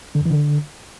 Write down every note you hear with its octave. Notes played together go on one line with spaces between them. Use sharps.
D3
F2
E3
D3